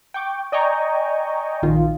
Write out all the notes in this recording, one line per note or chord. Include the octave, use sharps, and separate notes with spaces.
G5 C#6 D6
D5 D#5 G5 G#5 A#5 C#6
A#1 D#3 F4